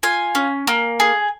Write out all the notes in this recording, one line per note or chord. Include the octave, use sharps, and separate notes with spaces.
F4 G#5
C#4
A#3
G#4